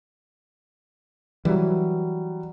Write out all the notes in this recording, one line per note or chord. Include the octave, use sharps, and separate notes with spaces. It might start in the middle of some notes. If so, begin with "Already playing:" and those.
E3 F#3 G3